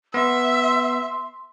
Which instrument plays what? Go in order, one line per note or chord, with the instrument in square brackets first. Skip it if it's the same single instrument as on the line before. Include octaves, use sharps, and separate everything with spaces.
[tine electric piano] B3 [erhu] E5 [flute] C6